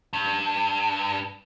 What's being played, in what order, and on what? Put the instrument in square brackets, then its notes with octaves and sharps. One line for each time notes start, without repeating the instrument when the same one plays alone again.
[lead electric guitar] G2